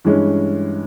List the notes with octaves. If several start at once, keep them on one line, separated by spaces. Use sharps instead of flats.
G2 E3 G#3 C#4